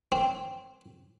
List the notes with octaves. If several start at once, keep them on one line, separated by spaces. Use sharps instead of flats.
C4